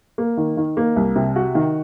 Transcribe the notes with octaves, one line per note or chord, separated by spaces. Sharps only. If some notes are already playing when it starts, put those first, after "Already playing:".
A#3
D#3
D#3
A#3
C2
C3
F#4
D#3